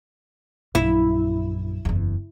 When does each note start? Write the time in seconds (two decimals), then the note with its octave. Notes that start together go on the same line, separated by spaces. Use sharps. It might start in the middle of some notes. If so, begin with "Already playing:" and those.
0.75 A#1 F#2 E4
1.85 F#1 E2